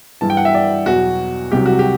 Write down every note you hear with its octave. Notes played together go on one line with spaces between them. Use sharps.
G2 E3 A5
G5
F#5
E5
D5
E2 B2 F#3 F#4
C2 C3 F#3 G4
F#4
G4